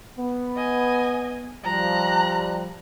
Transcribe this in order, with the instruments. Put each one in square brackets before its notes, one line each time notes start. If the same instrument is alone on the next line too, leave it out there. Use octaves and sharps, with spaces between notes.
[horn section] B3
[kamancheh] D#5 G#5
[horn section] F3 G3 [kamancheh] A#5 F#6